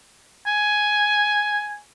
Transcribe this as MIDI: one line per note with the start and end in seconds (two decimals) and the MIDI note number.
0.46 1.76 80